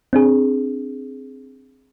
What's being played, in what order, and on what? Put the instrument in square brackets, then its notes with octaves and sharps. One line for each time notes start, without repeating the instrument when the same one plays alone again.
[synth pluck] C4 D4 G#4